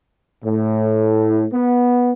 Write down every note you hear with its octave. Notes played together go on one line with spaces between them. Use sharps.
A2
B3